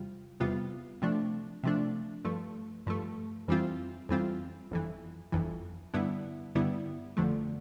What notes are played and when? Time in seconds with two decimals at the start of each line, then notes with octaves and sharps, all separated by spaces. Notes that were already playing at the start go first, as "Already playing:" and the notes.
Already playing: E2 C3 G3 F4
0.40 E2 C3 G3 B3 F4
1.02 C3 F3 A3 D4
1.63 C3 F3 A3 D4
2.25 G2 F3 A3
2.86 G2 F3 A3
3.48 F2 E3 G3 C4 F4
4.09 F2 E3 G3 C4 F4
4.71 G1 F2 E3
5.32 G1 F2 E3
5.94 G2 D3 G3 B3 E4
6.55 G2 D3 G3 B3 E4
7.17 G1 F2 D3 F3 A3